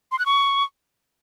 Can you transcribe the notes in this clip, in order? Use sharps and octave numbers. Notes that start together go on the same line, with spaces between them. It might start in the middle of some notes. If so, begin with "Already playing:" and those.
C6
F#6
C#6